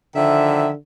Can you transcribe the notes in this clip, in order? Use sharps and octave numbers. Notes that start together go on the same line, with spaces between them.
D3 D#3 F3 E5